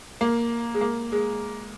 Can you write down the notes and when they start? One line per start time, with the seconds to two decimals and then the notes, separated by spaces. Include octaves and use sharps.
0.21 A#3
0.74 G#3
0.81 A#3
1.12 G#3